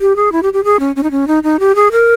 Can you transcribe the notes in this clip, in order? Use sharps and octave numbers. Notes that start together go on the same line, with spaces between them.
G4
G#4
E4
G4
G4
G#4
C#4
C#4
D#4
C#4
D#4
D#4
G4
G#4
A#4